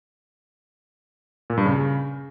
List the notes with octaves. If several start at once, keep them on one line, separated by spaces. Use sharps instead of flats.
A#2
G2
C#3